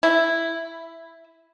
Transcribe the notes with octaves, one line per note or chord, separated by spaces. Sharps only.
E4